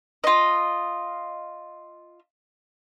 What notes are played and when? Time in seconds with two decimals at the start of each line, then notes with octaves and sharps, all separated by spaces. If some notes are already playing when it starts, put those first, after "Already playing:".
0.24 F4 D#5